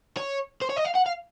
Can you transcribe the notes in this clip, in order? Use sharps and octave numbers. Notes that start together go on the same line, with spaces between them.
C#5
C5
C#5
D#5
F5
F#5
F5